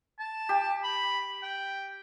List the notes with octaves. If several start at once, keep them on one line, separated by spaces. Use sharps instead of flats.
A5
G4
B5
G5